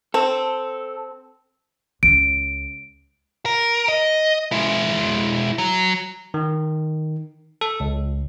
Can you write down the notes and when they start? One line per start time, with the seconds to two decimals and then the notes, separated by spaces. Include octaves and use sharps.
0.14 C4 A4
2.03 C#2 D7
3.46 A#4
3.88 D#5
4.52 G#3 E4
5.58 F#3
6.34 D#3
7.61 A4
7.80 C#2